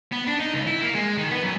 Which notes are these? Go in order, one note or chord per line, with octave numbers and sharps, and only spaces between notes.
B3
D4
D#4
C#2
E4
A#3
G#3
D#3
B3
F#2